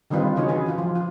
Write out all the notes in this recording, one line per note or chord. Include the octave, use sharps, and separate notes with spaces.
D3 D#3 G3 C4 F4 B4
C#3 E3 D#4 F#4 G#4 C#5
G#4 B4
E3 F4
F3
F4